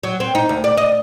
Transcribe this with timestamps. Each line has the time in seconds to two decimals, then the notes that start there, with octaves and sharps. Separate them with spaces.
0.03 F#3
0.20 C4
0.35 D#4
0.49 D2
0.64 D5
0.77 D#5